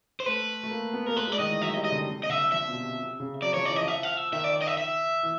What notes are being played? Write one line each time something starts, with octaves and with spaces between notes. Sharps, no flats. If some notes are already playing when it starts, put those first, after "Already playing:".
C5
A3 B4
A3
A#3
B3
A#3 A#4
A3 B4
G#3
D5
D#3 D#5
E3
F#3 E5
D#5
G3
D#5
D3
C3
D#5
D3 E5
F3 E5
B2
C3
C3
C#3
F#3 D5
F3 C#5
E3 D5
D#5
F3
E5
F5
E5
D#3 E5
D5
D#5
E5
E5
E3